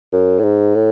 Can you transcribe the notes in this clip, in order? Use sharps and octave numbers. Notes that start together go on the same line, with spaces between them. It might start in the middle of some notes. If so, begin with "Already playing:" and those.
F#2
A2
G#2
A2